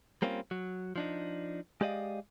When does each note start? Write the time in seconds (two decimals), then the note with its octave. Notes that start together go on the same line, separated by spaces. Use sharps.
0.22 G3 A#3 C4 C#4 F4
0.51 F#3
0.96 F3 D4 D#4
1.81 G#3 G4 D5 D#5 F5